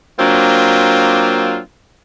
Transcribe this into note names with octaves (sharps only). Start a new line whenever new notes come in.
F#3 A#3 C4 D4 F4